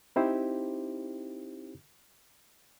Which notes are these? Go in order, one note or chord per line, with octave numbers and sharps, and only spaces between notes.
C4 D#4 E4 G4 C5